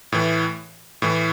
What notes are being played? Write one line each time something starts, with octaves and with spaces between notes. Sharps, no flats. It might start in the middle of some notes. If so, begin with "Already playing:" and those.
A2 E3
A2 E3